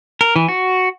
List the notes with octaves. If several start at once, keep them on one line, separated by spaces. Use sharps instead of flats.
A#4
E3
F#4